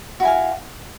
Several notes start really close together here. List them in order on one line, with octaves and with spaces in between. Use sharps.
F#4 E4 G#5 F5